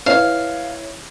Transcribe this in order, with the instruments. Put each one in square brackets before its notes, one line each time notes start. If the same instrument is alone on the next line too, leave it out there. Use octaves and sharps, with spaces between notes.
[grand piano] E4 B4 C#5 [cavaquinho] F5